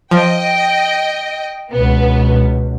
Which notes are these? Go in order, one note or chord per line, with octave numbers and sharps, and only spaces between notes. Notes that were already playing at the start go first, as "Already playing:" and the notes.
F3 D#5 G5
C#2 B2 B3